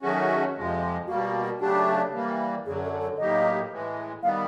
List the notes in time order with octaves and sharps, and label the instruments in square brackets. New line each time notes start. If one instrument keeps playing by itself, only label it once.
[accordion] D#3 F#3 A3 C#4 F#4 [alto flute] G#4
[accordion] F2 C3 F3 G#3
[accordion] B2 G3 A#3 [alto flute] F#4
[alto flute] F#4
F#4
[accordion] C#3 F#3 A3 D4 [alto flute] G4
[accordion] E3 G3 A#3
[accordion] F#2 D3 F#3 [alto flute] G#4
[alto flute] A4
A4
[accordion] A2 F#3 A#3 D#4 G4 [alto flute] D#5
[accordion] A2 E3 G#3
[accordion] D#3 G3 B3 [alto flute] F5